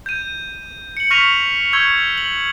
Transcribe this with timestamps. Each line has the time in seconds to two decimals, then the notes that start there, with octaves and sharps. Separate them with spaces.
0.06 G6 D#7
0.97 C#7 F#7
1.11 C#6 F6 A#6 B6 D#7 F7
1.73 C#6 E6 G6 G#6
2.18 F#7